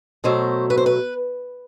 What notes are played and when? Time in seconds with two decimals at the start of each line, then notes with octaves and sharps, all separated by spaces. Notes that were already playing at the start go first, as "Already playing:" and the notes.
0.24 B2 F#3 A3 C5
0.70 B4
0.77 C5
0.86 B4